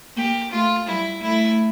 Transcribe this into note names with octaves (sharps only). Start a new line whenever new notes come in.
A#3 G4
A3 F4
G3 E4
A3 E4